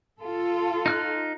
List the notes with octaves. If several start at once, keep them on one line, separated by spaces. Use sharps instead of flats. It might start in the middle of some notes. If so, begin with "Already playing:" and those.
F4 A4
D#4 F6 F#6